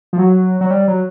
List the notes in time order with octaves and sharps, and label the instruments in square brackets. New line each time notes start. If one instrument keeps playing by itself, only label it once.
[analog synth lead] F3
F#3
F#3
G3
F#3